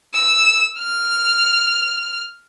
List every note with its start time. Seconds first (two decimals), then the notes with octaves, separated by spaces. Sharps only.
0.14 E6
0.79 F6